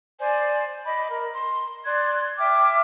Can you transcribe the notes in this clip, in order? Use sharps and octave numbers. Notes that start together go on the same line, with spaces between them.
C5 D5 G#5
D#5 B5 D6
A#4
C6
D5 C6 F#6 G#6
E5 G5 D6 F6